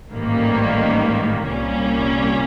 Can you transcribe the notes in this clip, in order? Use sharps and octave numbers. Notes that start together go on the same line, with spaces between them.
A1 G#2 D#3 G3 A#3
C2 A#2 G3 A#3 C#4